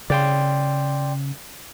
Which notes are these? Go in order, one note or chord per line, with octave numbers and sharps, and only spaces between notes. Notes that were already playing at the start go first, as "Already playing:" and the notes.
C#3 D5 G5 C6